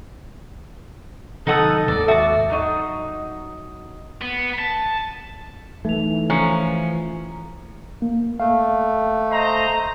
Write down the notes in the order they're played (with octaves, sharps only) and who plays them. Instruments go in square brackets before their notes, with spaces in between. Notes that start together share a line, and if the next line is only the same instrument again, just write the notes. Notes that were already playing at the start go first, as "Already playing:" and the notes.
[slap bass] C3 D#3 F#3 [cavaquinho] D#4 F#5 D#6 [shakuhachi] A4
[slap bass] D#2 G#2 [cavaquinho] D5
[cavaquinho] F#4 D6 [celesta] E5
[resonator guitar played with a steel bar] F#3 D#4 D#5
[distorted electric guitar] B3
A5
[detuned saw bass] E3 [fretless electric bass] A3 [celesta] D#4 F7
[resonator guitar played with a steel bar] F3 C#4 [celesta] A#5
[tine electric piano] A#3
[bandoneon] A3 [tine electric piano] F5
[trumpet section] C5 D#5 A#5